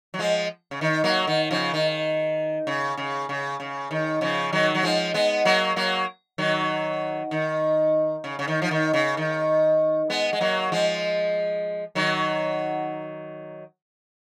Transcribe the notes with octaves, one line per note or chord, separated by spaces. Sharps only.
F#3
F3 G#3
C#3
D#3
F#3 A#3
D#3
C#3 F3
D#3
C#3
C#3
C#3
C#3
D#3
C#3 F3
D#3 F#3
F#3
F3 G#3
G#3 B3
F#3 A#3
F#3 A#3
D#3 F#3
D#3
C#3
C#3
D#3
F3
D#3
C#3
D#3
G#3 B3
G#3
F#3 A#3
F3 G#3
D#3 F#3